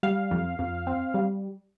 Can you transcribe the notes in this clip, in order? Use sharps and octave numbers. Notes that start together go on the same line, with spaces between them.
G3 F5
F2
F2
C4
G3